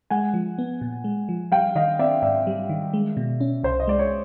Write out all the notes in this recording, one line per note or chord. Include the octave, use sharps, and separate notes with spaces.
G#3 F#5 G#5
F3
B3
A#2
G#3
F3
G3 F5 G5
D#3 D#5 F5
C4 D5 E5
G#2 D5 E5
G3
D#3
G#3
B2
C#4
C2 C5
D#5
G#3 D5
C#5